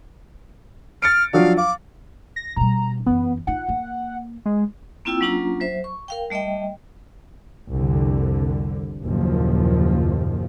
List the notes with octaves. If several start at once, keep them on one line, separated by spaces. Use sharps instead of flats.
F6 A6 C#7 D7
F3 F#3 D4 F5
F5 D6
A#6
B2 G3 A#5
F#2 E3 B3
D#4 F4 F#5
A#3
G#3
A#3 C4 E4 F4 G5 E6
F#3 A#3 C#4 D4 F4 A#5
F#3 C5 E5
C#6
A#4 F5 G5
G3 A3 D#5 E5 G5
C2 F2 D3
F#1 D#2 A#2 F3